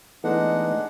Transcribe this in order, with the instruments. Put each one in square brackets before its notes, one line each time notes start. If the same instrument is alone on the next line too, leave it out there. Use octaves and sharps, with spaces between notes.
[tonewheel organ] E3 A3 B3 [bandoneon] G#3 D4 F#5 [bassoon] D#4